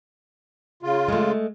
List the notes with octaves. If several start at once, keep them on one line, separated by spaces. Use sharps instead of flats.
C#3 F4
G#3 A3